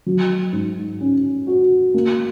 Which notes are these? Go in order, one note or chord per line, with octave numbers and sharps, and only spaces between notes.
F#3
G#2
C#4
F#4
A#3